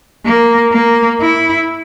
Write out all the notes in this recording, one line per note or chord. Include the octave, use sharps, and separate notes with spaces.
A#3
A#3
E4